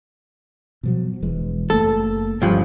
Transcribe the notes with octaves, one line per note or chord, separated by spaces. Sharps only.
B2 F3 F#3
E1 E3 G#3
F#1 A3 A#3 A4
C#2 G2 F3